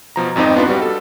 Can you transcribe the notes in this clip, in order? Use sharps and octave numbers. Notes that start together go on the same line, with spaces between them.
B2 F3 A#5
G#1 F2 C4 D#4 D#5
B3 D4 F4 B4
G3 F#4
A4